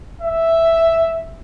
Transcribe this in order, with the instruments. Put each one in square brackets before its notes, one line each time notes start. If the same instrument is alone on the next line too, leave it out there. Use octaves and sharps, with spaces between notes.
[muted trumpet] E5